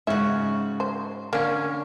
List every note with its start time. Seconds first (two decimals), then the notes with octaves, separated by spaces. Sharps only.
0.07 G#2 C#3 C#4 F#4 E5
0.80 C5
1.33 D3 A#3 C#4